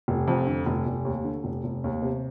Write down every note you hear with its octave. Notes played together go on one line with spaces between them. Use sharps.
F1
F2
D3
F1
F1
D#2
D3
F1
F1
D#2
C3